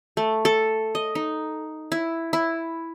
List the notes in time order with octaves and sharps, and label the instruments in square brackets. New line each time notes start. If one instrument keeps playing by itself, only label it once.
[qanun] A3
A4
D#5
D#4
E4
E4